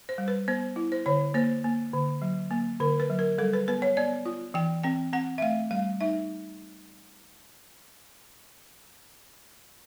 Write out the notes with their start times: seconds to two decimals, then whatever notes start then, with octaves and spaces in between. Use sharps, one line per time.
0.09 C5
0.18 G3
0.28 B4
0.48 B3 C5
0.76 E4
0.92 C5
1.06 D3 C#5
1.34 A#3 C5
1.64 A#3
1.94 D3
2.22 F#3
2.51 A#3
2.80 D3 A#4
3.00 B4
3.10 F#3
3.19 A#4
3.38 G3 A4
3.53 B4
3.68 B3 B4
3.82 C#5
3.97 B3 D5
4.26 F4
4.54 E3 G5
4.84 C4 G5
5.13 C4 F#5
5.38 E5
5.42 A3 F5
5.71 G3 F5
6.01 D#4 E5